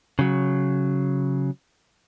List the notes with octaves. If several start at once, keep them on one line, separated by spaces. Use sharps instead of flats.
C#3 F#3